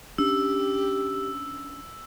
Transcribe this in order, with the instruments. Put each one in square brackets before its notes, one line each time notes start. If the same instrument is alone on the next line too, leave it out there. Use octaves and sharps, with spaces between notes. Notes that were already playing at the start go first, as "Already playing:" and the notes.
[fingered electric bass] C#4 D4 [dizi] G4 [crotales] E6